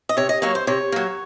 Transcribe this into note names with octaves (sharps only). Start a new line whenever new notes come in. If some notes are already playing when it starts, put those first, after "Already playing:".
D#5
C3 C#5
D#5
F#3 A#3 C#5
C5
C3 C#5
F#3 A#3